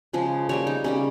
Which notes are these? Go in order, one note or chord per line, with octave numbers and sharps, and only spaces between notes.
C#3 F3 G#3
C#3 G3 A#3 C#5
D#4
C#3 G3 A#3 C#4